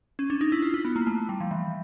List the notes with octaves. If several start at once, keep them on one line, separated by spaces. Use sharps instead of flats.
C#4
D4
D#4
E4
F4
E4
B3
A#3
A3
G3
F3
E3